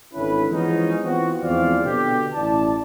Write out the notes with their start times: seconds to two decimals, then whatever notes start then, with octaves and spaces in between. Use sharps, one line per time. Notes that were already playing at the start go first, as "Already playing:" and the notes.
0.13 G#1 D3 C#4 E4 B4
0.50 E3 F3 G#3 B3 C#4 D#4
1.03 E3 B3 C4 F4 F#4
1.42 E2 F3 G#3 C4 D5 F5
1.83 B2 D3 G4
2.34 A1 E4 D5 A5